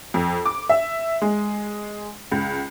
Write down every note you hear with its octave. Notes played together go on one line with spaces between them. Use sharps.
F2
D6
E5
G#3
C#2